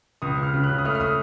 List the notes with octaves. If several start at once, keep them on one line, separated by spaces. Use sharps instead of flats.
C#2 D#6
C#2 F6
C#3
F#6
C#3
D#6
A3 F6
F6
D#6